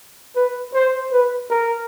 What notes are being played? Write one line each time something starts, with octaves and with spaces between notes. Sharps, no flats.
B4
C5
B4
A#4